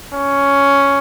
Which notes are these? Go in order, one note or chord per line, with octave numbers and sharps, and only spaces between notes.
C#4